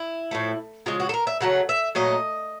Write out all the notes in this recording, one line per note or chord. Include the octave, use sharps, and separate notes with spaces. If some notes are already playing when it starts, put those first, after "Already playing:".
Already playing: E4
A2 F3 A3
C#3 F3 G#3 F4
F#4
A4
A#4
E5
C#3 F#3 A3 F#5
E5
A#2 F#3 A3 D#5